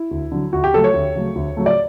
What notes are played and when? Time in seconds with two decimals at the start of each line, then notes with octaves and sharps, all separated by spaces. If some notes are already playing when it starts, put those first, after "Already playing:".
Already playing: E4
0.11 D2
0.32 D3 F#3
0.52 D2 F#4
0.64 G4
0.73 C#3 F#3 A3 A4
0.84 C#5
0.94 D2
1.15 C#3 F#3 A3
1.35 D2
1.57 C#3 F#3 A3
1.66 D5